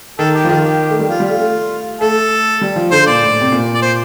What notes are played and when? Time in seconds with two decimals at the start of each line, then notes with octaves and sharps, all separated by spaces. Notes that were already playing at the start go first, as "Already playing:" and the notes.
0.19 D#3 A4
0.35 G4
0.45 F3
0.49 D#3 F4
0.65 G4
0.90 A3
0.99 G3
1.09 F3 F4
1.20 G3
1.25 A3 F4
1.40 A3
2.01 A3 A4
2.61 G3
2.76 F3
2.91 D3 C5
3.07 A#2 D5
3.22 A2
3.41 C3
3.52 A#2
3.74 D5
3.82 C5